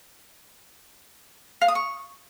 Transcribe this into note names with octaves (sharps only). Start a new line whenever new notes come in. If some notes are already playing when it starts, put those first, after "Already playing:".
F5
D#6
C#6